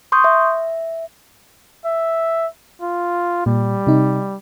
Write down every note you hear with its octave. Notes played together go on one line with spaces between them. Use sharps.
C6 C#6 D#6 G6
E5
E5
F4
A#2 G3
C3 D#4